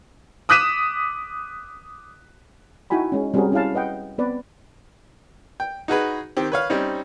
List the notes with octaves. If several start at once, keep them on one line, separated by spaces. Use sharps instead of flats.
D6 D#6 F#6 B6 D#7 E7
D#4 E4 F#4 G5 G#5 B5
G#3 C#4
G3 C4 C#4 F#4 G#4 A#4
C#4 E4 G#4 F5 A5
B4 D#5 F#5 G5
B3 C4 B4 D5
G5
D#4 F#4 G#4 B4
D#3 C4 G4
B4 C#5 F5
G3 C4 C#4 D#4